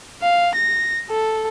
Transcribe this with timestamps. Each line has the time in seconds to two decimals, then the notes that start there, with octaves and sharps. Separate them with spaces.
0.23 F5
0.56 A#6
1.10 A4